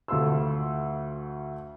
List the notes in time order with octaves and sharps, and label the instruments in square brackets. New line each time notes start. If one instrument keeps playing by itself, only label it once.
[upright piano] D2 A3 F4 C6 E6